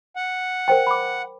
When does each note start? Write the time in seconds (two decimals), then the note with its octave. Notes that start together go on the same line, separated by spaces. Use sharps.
0.16 F#5
0.68 A#4 C5 G5
0.87 B5 D6